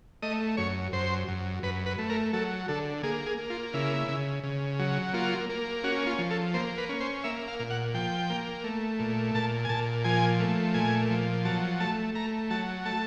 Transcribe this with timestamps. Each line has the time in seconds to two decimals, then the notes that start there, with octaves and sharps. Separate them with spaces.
0.22 A3 D#5
0.57 F#2 C#5
0.92 F#2 C5
1.28 F#2
1.63 F#2 B4
1.86 B4
1.98 A3
2.10 A#4
2.33 F#3 A4
2.68 D3 A4
3.03 A#3 G#4
3.26 G#4
3.38 A#3
3.50 F4
3.74 C#3 E4
4.08 C#3
4.43 C#3
4.79 F#3
5.14 A#3 F4
5.49 A#3
5.83 C#4 F#4
6.07 F4
6.18 F3
6.31 A4
6.54 A#3 C5
6.78 B4
6.89 C#4
7.00 C5
7.24 A#3 E5
7.48 F5
7.59 A#2
7.70 F#5
7.94 F3 G5
8.30 A#3
8.64 A3
9.00 A#2
9.35 A#2 A5
9.65 G#5
9.69 A#2 A5
10.04 F3 G#5
10.40 A3
10.74 A#2 G#5
11.10 F3
11.45 F#3 A5
11.80 A3 A5
12.14 A3 A#5
12.50 F#3 A5
12.85 A3 A5